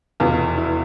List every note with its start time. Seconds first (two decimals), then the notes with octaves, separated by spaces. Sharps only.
0.20 F1 E2 B2 F4
0.58 E4